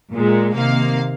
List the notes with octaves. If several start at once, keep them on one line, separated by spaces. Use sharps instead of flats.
A#2 G#3
C3 D#3 A#3 F5